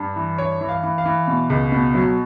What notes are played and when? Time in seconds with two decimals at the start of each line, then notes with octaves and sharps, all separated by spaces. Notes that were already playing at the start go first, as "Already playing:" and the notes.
Already playing: G2
0.16 E3
0.38 G2 C#5
0.61 E3
0.69 F5
0.83 E3
0.98 F5
1.05 E3
1.27 B2
1.50 C#2
1.72 B2
1.94 F#3